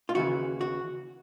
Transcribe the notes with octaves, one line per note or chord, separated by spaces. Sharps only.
F4
D#2 C#3 E3 F#4
F#4